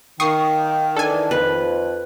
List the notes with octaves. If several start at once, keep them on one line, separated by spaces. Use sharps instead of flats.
D#3 A#3 G5 C#6 D#6 C7
E3 D4 A4 G#5
F2 B4